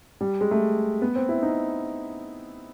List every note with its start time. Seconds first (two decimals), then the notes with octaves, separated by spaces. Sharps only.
0.21 G3
0.41 G#3
0.51 A3
1.02 B3
1.15 C4
1.29 E4
1.42 D#4